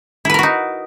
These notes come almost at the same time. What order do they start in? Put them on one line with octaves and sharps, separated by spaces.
E4 B4 A#4 F#4 D#4